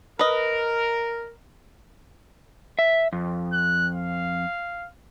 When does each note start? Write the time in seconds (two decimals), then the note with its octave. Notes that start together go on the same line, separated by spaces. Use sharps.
0.19 A#4 B4 D#5
2.79 E5
3.13 F2
3.53 F#6
3.93 F5